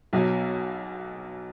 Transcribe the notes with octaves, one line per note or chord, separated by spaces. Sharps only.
B1 B2 F#3